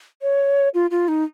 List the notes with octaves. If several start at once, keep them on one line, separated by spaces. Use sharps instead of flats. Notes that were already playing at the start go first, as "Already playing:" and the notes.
C#5
F4
F4
D#4